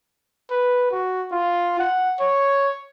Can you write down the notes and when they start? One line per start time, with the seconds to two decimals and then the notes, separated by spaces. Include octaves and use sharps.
0.51 B4
0.91 F#4
1.32 F4
1.79 F#5
2.21 C#5